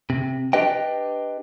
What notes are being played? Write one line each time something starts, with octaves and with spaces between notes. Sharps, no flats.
C3
D4 G4 B4 D#5 G5